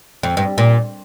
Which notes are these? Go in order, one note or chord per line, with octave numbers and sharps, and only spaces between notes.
F2
G2
A#2